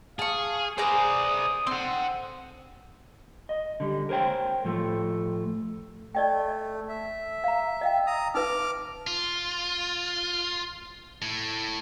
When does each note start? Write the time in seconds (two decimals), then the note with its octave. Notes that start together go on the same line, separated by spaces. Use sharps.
0.19 G#4 F5 A5 C#6
0.78 G#4 B4 C5 D5 A#5 D#6
1.67 C4 F#5 C6
3.49 D#5
3.80 D3 G3
4.09 A#4 C5 C#5 G5
4.65 A2 F3 A3
6.15 A3 D5 D#5 G5
6.89 E5
7.44 F5 A#5
7.81 D#5 F5 G5
8.07 A#5 D#6
8.35 D#4 B4 E5 D6 F6
9.07 F4
11.22 A2